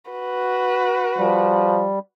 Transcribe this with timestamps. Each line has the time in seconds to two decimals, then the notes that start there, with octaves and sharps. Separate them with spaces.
0.11 F#4 B4
1.18 F3 G3